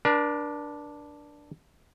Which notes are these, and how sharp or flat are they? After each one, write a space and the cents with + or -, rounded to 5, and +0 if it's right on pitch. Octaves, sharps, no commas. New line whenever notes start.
D4 +0 A#4 +45